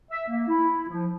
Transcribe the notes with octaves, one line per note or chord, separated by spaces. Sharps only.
E5
A#3
E4
F3